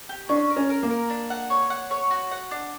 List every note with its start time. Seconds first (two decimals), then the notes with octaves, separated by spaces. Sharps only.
0.09 G4
0.29 C#4 D4
0.50 A#4
0.56 C#4
0.70 A#4
0.83 A#3
0.90 A#4
1.10 D4
1.30 F#5
1.50 C#5
1.70 F#5
1.91 C#5
2.11 F#4
2.31 F#5
2.51 D4